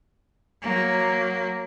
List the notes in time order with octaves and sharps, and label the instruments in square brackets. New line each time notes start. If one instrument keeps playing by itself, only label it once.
[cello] F#3 A#3